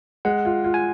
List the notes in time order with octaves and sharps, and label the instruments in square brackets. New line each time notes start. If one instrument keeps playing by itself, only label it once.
[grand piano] G#3 [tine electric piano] F#5
[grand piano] F4
F4
[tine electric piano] G#5